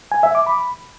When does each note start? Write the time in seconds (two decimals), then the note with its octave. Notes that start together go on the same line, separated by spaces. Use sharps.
0.12 G#5
0.23 E5
0.35 D6
0.47 B5